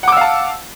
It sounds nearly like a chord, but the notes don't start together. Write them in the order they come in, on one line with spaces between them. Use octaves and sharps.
F#5 D6 E6 F5 A5